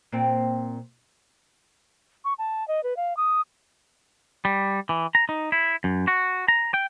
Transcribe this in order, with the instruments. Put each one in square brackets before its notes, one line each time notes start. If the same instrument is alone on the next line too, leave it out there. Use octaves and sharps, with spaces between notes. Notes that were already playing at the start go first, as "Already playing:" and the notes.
[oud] A#2 C4
[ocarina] C#6
A5
D#5
B4
F5
D#6
[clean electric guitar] G3
E3
A#5
D#4
E4
F#2
F#4
A#5
G5